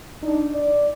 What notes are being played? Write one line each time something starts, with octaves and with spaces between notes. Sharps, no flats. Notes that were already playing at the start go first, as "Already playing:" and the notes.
D4 D#4
D5